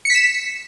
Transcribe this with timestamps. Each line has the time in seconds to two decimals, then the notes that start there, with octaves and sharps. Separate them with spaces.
0.05 C#7
0.10 B6
0.15 E7